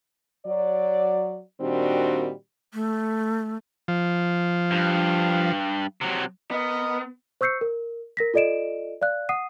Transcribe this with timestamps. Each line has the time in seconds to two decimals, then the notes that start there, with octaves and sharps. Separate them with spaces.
0.46 F#3 D5
1.61 A#2 D#3 G3 C4 D4 F#4
2.74 A3
3.88 F3
4.71 G2
6.01 C3 F#3
6.51 B3 A#4 D#5
7.41 C5 C#6 E6 G6 C7 C#7
7.61 A#4
8.17 A#4 A#6 B6
8.34 F4 A4 D5 D#5 D7 E7
9.02 D5 F5 F#6
9.29 F#5 D#6 C7 D#7